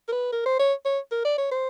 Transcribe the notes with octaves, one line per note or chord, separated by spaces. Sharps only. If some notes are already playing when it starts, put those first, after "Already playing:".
A#4
B4
A#4
C5
C#5
C#5
A#4
D5
C#5
C5